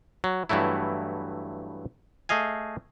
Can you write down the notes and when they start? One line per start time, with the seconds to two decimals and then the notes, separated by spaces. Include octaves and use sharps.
0.24 F#3
0.49 G2 E3 F#3 A3 E4
2.29 A3 G#4 D#5 F5 G#5